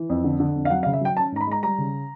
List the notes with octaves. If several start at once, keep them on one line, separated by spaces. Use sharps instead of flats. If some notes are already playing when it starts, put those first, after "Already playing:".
Already playing: E3
F2
D3
D3
F2
F5
F#3 F#5
F5
C#3
E5
F#3 G5
C#4 A5
G#2 A#5
B5
G#3 A#5
G3 A#5
C#3